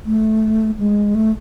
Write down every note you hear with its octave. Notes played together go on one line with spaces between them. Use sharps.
A3
G#3
A3